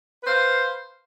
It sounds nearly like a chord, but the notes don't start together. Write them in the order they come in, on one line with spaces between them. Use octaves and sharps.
B4 C5 F5